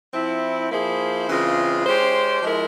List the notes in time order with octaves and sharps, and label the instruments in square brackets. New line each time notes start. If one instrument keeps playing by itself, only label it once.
[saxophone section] F3 C4 E4
F3 A#3 E4 G#4 C5
C#3 E3 G#3 C4 F4
G#3 C#4 G4 C5
F3 G#3 E4 A#4